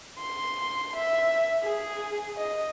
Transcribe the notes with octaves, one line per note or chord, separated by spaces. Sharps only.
C6
E5
G#4
D#5